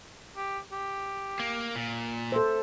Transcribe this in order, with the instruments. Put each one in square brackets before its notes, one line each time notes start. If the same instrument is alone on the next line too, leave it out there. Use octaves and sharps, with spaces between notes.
[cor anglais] G4
G4
[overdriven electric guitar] A#3
A#2
[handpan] A4 C5 [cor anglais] E5